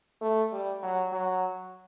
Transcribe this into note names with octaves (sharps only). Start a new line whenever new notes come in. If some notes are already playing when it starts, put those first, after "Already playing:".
A3
G3
F#3
F#3